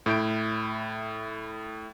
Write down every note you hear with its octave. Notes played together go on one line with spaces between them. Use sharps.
A2 E4 G6 D7